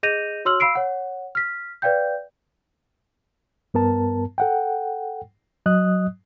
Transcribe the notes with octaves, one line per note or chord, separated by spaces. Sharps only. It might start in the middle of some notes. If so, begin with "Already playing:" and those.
G#4 D#5 G6 A#6 D#7 F7
F#4 C#5 C6 E6 F6 F#7
F5 B5 E6 C7 D7
C#5 F#5
F6 B6
B4 D5 F5 G5 G6
G2 B3 A#4 A5
A4 F#5 G5
F#3 D#5 D#6 F#6